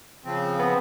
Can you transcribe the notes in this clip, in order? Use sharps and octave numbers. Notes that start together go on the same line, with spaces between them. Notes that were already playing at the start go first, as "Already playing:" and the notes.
C#3 F3 C4
B3